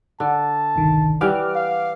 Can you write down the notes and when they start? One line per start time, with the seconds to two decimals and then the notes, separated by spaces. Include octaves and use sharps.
0.20 D3 A5
0.76 G1 C2 D#3
1.21 E3 G3 F#5 D6 F6
1.55 F5